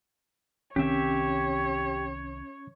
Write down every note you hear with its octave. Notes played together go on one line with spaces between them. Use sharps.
C2 D#3 C4 C#4 G4 C#5 E5